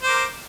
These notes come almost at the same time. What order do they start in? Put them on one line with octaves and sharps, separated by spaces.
C5 D6 A#4